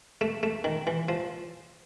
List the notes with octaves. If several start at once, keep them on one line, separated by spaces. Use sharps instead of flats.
A3
A3
D#3
E3
F3